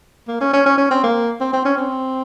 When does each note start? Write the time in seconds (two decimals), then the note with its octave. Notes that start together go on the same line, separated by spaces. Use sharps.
0.28 A#3
0.41 C#4
0.53 C#4
0.66 C#4
0.77 C#4
0.91 C4
1.04 A#3
1.41 C4
1.53 C4
1.65 C#4
1.78 C4